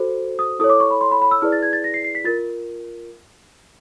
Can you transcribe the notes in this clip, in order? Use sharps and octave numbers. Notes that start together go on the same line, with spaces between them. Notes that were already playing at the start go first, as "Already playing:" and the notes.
Already playing: F#4 A4 C5
D#6
E4 A4 C#5 D#6
D6
C#6
B5
C6
B5
B5
E6
E4 G#4 B4 D5 F6
A6
G#6
A6
A#6
C7
C7
B6
F4 A#4 A6